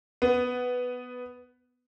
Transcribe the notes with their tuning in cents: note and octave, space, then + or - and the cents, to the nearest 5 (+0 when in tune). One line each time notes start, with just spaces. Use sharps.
B3 +5